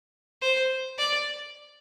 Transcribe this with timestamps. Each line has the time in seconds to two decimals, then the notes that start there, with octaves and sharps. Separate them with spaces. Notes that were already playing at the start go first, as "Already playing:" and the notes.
0.42 C5
0.98 D5